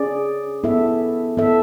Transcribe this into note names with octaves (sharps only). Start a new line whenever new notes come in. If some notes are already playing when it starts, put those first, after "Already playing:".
Already playing: C#4 G#4 D5
B3 E4 A4 E5
B3 E4 A4 E5